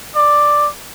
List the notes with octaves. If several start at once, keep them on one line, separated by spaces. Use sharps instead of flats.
D5